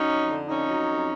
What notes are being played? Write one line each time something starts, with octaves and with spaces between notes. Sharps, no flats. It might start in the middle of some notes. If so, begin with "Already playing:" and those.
Already playing: F#3 C#4 D#4
F2
D3
F2 C#4 D#4
F#3
F2